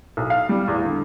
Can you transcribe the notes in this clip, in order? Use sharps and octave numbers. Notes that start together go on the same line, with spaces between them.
B1
F5
G3
E2
D3